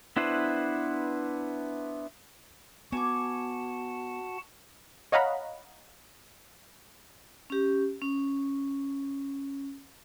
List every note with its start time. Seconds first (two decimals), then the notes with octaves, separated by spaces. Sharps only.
0.17 B3 D4 E4 B4 C5
2.92 B3 F#4 F#5 G#5 A5 D6
5.12 C#5 D#5 F5 F#5 A#5 B5
7.50 C#4 G4
8.02 C#4